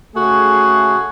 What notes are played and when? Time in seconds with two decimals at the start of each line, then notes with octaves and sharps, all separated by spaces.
0.16 C#3 A3 F#4 G#4